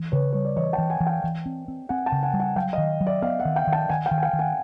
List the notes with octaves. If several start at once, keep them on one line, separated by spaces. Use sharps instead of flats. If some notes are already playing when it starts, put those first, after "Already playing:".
Already playing: E3
C#3 B4 C#5
G3 C#5
D5
E3 C#5 D#5
G5 A5
E3
F#5 G#5
E3
F5 G5
E3
C4
C4
C4 F#5 G#5
G5 A5
C#3
F#5 G#5
G3
F#5 G#5
F#3 F5 G5
D#5 F5
D#3
F#3
D5 E5
B3 D#5 F5
E5 F#5
D#3
F5 G5
D#3
G5 A5
D#3 F#5 G#5
F5 G5
D#3
G#5
F5 G5
D#3
F#5 G#5